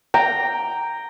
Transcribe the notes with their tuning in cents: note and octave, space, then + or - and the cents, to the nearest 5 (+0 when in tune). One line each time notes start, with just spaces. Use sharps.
G5 +0 A#5 -5